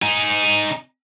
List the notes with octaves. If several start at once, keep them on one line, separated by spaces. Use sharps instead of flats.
D#4 G#4